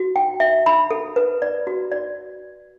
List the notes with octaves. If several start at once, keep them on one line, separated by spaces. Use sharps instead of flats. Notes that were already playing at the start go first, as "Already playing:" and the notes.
Already playing: F#4
G5
E5
B5
A4
B4
D5
F#4
D5